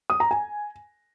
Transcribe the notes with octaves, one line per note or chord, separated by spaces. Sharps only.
D#6
A#5
G#5